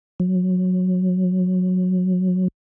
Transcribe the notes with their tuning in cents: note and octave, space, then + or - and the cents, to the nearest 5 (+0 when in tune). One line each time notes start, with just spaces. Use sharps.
F#3 -15